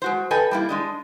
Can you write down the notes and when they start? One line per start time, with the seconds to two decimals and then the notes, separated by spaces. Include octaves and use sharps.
0.02 G#3 F#4 C5
0.31 A4 B4 D#5 G5 G#5
0.51 G3 A#3 E4
0.69 G#3 D4 D#5